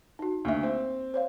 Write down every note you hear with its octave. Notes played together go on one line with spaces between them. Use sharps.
D#4 F#4
D2 A#3 E5
C4
C5 C#5 F5